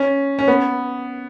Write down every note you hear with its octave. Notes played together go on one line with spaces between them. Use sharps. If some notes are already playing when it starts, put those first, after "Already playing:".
Already playing: C#4
C#4
B3